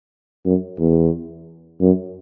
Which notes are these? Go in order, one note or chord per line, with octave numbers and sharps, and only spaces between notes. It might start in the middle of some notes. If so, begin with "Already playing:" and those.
F#2
E2
F#2